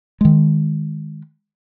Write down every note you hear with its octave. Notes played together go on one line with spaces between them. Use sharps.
D#3 G#3